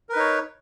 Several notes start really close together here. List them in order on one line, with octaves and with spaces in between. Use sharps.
A#4 B4 D#4 C#5